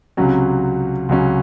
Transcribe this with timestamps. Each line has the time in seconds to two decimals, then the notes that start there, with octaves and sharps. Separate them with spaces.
0.17 C#2 C3 F#3 C#4
1.09 C#2 C3 F#3 C#4